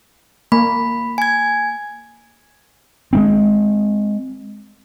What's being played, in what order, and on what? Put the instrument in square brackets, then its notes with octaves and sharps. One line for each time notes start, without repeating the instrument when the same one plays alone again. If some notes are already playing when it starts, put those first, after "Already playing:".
[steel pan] A#3 [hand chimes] B5
[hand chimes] G#5 G#6
[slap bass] G#3 A#3 C4